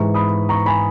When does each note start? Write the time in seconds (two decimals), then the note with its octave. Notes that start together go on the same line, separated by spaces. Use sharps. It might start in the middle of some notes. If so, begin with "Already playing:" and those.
Already playing: G#2 E3 G#3 A#5 C#6
0.14 B5 D#6
0.49 A#5 C#6
0.66 G#5 B5